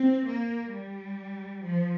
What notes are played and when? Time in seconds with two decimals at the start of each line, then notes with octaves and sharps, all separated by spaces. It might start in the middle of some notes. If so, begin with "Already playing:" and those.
Already playing: C4
0.26 A#3
0.72 G3
1.62 F3